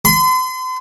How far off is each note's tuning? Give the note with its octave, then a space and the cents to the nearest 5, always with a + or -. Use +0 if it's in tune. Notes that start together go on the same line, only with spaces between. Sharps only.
C6 -40